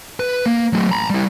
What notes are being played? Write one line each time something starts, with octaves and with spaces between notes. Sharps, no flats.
B4
A#3
F#3 A3
A#5 B5
G3 E4